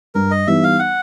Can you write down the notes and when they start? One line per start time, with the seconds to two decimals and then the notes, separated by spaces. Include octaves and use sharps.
0.15 G2 A#4
0.31 D#5
0.47 E3 G3 B3 D#4 E5
0.64 F5
0.79 F#5